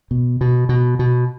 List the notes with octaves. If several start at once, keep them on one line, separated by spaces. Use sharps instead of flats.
B2
B2
B2
B2